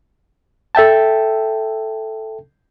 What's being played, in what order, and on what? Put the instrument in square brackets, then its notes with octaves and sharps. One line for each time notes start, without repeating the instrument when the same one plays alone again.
[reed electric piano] A4 E5 G5 A5